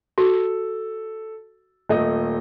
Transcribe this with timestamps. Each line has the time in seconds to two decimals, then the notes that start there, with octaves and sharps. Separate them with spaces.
0.18 F#4 A4
1.89 D#1 A3 D#5